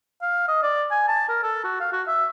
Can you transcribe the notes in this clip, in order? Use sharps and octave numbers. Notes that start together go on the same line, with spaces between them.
F5
D#5
D5
G#5
A5
A#4
A4
F#4
F5
F#4
E5